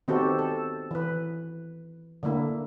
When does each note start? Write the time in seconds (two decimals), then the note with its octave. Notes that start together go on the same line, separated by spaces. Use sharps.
0.08 D#3 B3 C4 F#4 G4 A4
0.39 A4
0.91 E3 B4
2.23 D3 A3 A#3 E4